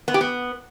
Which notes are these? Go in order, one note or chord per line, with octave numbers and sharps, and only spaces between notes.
B3
G4
B3